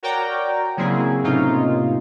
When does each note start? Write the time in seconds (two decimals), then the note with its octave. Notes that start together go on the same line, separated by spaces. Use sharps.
0.03 F#4 A#4 C#5 D5 G5 A#5
0.77 C#3 F#3 A#3 C4 E4 G#4
1.24 A2 C3 A#3 C#4 D#4 F4